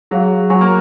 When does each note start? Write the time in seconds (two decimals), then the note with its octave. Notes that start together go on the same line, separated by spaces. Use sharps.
0.11 F#3 G#4 C#5 F5
0.50 F#3 C#5 G#5 C#6
0.61 A#3